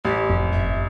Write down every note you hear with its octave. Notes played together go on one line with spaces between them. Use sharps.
A1 G4
F1 F2
F#1 C#3 E5